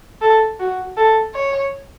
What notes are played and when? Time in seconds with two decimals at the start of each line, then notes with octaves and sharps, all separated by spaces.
0.22 A4
0.60 F#4
0.97 A4
1.35 C#5